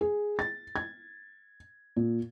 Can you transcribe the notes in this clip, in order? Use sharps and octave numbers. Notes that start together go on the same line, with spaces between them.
G#4
A6
G#6
A#2